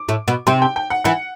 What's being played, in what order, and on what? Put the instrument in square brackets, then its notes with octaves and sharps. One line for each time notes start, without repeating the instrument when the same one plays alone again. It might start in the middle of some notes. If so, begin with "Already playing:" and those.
Already playing: [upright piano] D6
[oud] A2 A3
B2 B3
[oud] C3 C4 [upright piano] C6
[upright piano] G5
G5
F#5
[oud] E3 E4 [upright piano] F#5